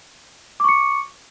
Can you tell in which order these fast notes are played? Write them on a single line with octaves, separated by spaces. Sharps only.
D6 C#6 C#7